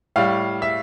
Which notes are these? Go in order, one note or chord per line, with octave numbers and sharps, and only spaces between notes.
A2 G3 F5
E5